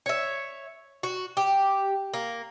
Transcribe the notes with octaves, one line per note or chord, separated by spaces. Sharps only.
C#5 E5
F#4
G4
A#3